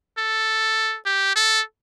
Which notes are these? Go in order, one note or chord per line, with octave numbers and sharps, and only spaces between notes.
A4
G4
A4